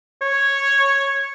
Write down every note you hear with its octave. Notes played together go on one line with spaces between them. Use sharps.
C#5